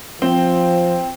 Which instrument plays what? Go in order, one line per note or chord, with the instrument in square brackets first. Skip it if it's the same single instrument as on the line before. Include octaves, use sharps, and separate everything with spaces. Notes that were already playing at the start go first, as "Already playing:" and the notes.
[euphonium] F3 [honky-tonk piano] C4 [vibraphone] G5